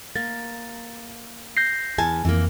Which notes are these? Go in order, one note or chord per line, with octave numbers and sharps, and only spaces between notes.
A#3 A6
G6 A#6 C7
E2 G#5 A5
F2 E3 A#3